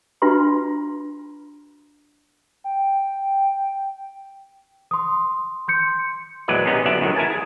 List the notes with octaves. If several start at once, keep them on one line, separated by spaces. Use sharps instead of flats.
D4 F4 F#4 B4 A#5 C6
G5
C6 D#6
C6 G6 C#7
A#1 E2 F#3 G#3 B4 D5
A#1 C3 B3 C#4 D#4 G#4
G1 F#2 B3 D5 E5
F#2 A2 D#3 F#3 G#3
E4 A#4 G#5 A5
G#4